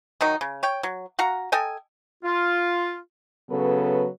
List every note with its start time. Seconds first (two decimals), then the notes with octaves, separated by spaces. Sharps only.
0.21 D#3 F#3 D#4
0.41 C#3
0.63 C#5 G5
0.83 F#3
1.19 F#4 F5 F#5 A#5
1.52 A4 D#5 G5 G#5
2.23 F4
3.50 C#3 F#3 B3 A4 B4